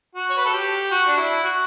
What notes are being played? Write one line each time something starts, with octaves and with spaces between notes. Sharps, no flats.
F#4
C#5
B4
A4
G4
F#4
D4
E4
F#4